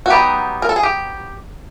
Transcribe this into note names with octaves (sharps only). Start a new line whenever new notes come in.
F#4
F#3 B3 D#4 G4
A#4
A4
G#4
G4